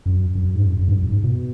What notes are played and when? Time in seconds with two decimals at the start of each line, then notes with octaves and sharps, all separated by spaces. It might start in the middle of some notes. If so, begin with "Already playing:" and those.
0.06 F#2
0.35 F#2
0.55 G#2
0.64 F#2
0.79 F#2
0.88 G#2
0.94 F#2
1.08 G#2
1.24 B2